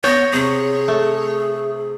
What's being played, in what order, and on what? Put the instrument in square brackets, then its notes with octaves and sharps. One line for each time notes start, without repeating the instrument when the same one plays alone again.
[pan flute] B3 [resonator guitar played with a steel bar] C#5 [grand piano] G6 A#6
[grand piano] C3 [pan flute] G#4
[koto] A3